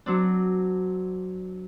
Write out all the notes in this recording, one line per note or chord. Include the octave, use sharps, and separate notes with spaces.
F#3 C4 D4